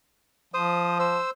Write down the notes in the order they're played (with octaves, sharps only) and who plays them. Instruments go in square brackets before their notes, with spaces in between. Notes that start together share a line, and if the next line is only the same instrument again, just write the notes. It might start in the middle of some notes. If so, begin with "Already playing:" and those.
[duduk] F3 [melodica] C5 D#6
[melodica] C5 E6